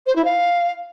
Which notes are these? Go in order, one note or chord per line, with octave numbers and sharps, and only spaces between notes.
C5
E4
F5